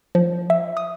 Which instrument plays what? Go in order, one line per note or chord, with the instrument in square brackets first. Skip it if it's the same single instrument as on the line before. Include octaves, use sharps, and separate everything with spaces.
[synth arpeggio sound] F3
E5
D#6